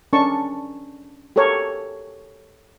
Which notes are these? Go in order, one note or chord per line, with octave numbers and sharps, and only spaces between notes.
C#4 D4 A#4 A5 C#6
G4 A4 A#4 C#5